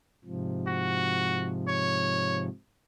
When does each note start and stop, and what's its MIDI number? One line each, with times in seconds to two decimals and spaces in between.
0.25 2.49 44
0.25 2.49 48
0.25 2.49 53
0.67 1.52 66
1.67 2.43 73